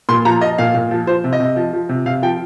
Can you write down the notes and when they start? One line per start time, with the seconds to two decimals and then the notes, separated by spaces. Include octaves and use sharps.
0.09 A#2 C6
0.25 F3 A#5
0.41 F3 D#5
0.58 A#2 F5
0.75 A#2
0.91 F3
1.07 F3 C5
1.24 C3
1.33 D#5
1.40 C3
1.56 F3
1.73 F3
1.89 C3
2.06 C3 F5
2.22 F3 G5